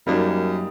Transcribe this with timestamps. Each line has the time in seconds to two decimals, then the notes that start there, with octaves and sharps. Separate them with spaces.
0.07 F#2 G3 A#3 D#4